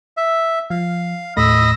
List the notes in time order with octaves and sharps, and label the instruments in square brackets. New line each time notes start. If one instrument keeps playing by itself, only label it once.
[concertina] E5
[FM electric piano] F3 [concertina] F5
[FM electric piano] D#2 A2 A3 [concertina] D#5 B5 [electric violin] E6 A#6